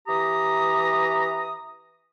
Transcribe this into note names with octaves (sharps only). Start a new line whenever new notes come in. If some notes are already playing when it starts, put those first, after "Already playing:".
E3 G4 A#5 D#6